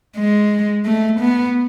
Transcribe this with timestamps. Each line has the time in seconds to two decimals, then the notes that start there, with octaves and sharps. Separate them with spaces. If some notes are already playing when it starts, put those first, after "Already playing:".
0.17 G#3
0.86 A3
1.20 B3